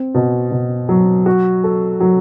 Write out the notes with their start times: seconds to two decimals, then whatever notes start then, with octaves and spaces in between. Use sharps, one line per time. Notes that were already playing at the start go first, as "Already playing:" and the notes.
Already playing: C4
0.15 B2
0.51 B2
0.89 F#3
1.26 F#4
1.64 A4
2.00 F#3